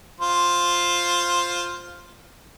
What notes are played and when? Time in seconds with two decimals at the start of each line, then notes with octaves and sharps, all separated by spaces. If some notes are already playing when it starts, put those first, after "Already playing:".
0.20 F4 C5